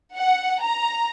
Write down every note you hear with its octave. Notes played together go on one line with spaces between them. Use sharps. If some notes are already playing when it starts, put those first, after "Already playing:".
F#5
A#5